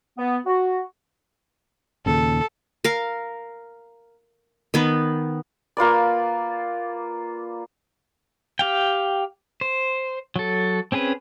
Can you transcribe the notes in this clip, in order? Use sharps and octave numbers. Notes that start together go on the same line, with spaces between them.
B3
F#4
D#2 A#2 C#3 A4
A#4 F5
D#3 B3
A#3 F4 B4 D5
G4 F5 G5
C5
F#3 A4
C4 C#4 G#4 B4